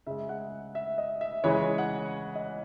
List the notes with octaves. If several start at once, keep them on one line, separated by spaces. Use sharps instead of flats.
C#3 G#3 E5
F#5
E5
D#5
E5
C#3 E3 G#3 C#5
F#5
D#5